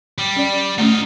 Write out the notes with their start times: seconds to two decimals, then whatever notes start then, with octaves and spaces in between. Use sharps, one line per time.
0.18 G3
0.36 C#4 D5
0.79 A3 C#4 D#4 F4